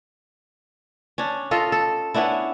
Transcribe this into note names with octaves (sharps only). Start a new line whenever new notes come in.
C#4 D4
F4 A4 D#5 F5
A4
B3 C#4 D4 E4